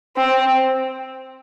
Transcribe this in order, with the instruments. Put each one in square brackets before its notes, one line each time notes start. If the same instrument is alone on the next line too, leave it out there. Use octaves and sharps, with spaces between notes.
[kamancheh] C4